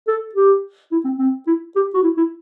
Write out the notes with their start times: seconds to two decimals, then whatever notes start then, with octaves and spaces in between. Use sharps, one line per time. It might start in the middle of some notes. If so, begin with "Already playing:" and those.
0.08 A4
0.35 G4
0.92 E4
1.04 C4
1.18 C4
1.47 E4
1.76 G4
1.94 F#4
2.03 E4
2.17 E4